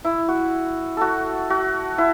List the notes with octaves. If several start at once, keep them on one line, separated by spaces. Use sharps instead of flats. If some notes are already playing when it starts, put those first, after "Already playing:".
E4
F#4
F#4 A4
F#4
E4